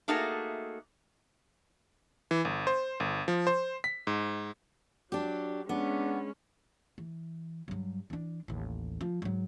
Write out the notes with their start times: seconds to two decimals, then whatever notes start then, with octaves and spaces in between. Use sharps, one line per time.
0.08 A3 A#3 D#4 F#4 G#4 A4
2.31 E3
2.45 G1
2.67 C5
3.00 G1
3.28 F3
3.47 C5
3.84 B6
4.07 G#2
5.12 F#3 D4 G4
5.69 G#3 B3 C#4 D4
6.98 E3
7.68 G2 F#3
8.10 E3 D4
8.48 A1 D#2
9.01 F3
9.22 G#2 F#3